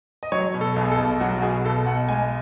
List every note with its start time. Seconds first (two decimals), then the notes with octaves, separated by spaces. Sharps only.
0.23 D#5
0.32 F#3 C#5
0.54 B2
0.61 A4
0.76 B1
0.81 G#4
0.91 A4
0.98 B1
1.21 F#3 F#4
1.38 F#4
1.42 B2 G#4
1.65 B1 A4
1.86 B1 F#5
2.09 G#3 G#5